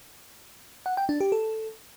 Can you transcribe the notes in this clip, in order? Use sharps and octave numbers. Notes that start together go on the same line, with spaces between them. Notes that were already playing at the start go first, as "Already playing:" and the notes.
F#5
G5
D4
G4
A4